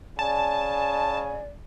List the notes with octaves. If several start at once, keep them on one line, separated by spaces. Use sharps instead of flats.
C#3 D5 G#5 A5